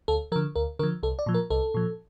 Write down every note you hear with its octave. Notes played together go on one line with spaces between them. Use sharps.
D2 A4
D3 F3 A#4
D2 A#4
D3 F3 A#4
C2 A4
D5
A#2 F3
A#4
C2 A4
A#2 F3